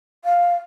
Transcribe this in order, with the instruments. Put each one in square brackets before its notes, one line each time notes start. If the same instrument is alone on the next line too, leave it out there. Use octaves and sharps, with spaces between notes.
[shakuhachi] F5